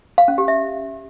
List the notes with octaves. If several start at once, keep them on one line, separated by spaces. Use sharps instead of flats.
F5
C#4
G4
E5